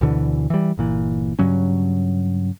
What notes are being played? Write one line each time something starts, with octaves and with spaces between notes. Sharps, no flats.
D2 B2 D3 E3
E3 G3
G1 A#2 E3
G2 C#3 F#3 C#4